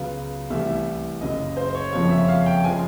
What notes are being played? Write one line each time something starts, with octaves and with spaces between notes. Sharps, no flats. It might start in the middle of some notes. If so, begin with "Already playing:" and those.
Already playing: C#2 C#3 F#3 B3 F5
C2 C3 E3 A3 E5
F#1 F#2 C#3 F#3 D#5
C5
C#5
F#1 F2 C#3 F3 G#3 C#5
E5
F5
G5
C#3 F3 G#3 G#5